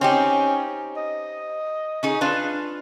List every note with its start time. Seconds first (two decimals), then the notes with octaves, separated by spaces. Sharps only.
0.01 C4 C#4 D#4 G4
0.97 D#5
2.03 C#4 D#4 G#4
2.21 D4 F4 B4